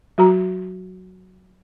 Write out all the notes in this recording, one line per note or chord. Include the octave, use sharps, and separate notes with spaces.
F#3 F#4 A#5